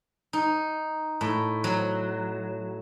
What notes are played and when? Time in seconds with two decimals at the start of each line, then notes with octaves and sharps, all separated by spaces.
0.33 D#4
1.21 A2
1.64 F#3